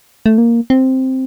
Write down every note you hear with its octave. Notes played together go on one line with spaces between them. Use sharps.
A3
A#3
C4